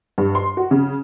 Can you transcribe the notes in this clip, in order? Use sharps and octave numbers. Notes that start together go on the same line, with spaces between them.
G2
C6
F#4
C#3